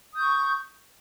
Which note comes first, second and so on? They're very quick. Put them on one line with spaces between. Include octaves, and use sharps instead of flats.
D#6 G6 C#6